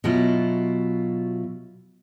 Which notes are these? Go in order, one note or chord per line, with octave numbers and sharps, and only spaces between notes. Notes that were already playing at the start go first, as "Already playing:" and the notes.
B2 F#3 E4 F4